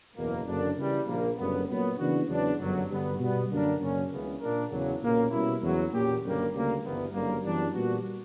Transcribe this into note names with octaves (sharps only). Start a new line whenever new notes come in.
F#1 E2 B2 A#3
F#1 F#2 D3 A#3 D4
C#3 E3 G3
A#1 A#2 A#3
F#1 F#2 D3 G3 B3
A#2 F#3 B3
C#3 E3 B3 D4 F#4
E2 C#3 F#3 B3 D4
G1 F#2 D3 F#3
G2 D3 G3 B3
B2 G3 B3
F#2 D3 A#3 D4 A#4
F#2 C#3 F#3 A#3 C#4
C#2 C#3 E3 B3
A#2 A#3 D4 A#4
E2 C#3 F#3
B1 A#2 F#3 A#3 C#4
B2 G3 C#4 E4
E2 C#3 F#3
A#2 A#3 C#4 G4
F#1 F#2 D3 G3 A#3
D2 C#3 G3 A#3
G1 G2 E3 B3
F#1 F#2 D3 G3 A#3
F#2 E3 G3 B3 D4
A#2 G3 B3 F#4